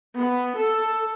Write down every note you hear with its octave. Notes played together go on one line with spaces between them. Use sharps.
B3
A4